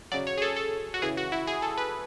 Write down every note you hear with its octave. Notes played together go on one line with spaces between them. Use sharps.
C#3 F#3 D5
C#5
G#4
A4
A4
F#4
C#3 E3 G#4
F#4
E4
G#4
A4
B4